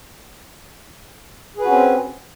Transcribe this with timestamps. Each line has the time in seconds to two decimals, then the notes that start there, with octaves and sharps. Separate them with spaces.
1.57 G#4
1.61 B4
1.64 F#4
1.68 C#4
1.72 C4